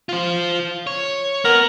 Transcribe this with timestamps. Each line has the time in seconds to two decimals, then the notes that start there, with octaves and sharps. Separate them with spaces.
0.09 F4 C5
0.87 C#5
1.45 B3 A#4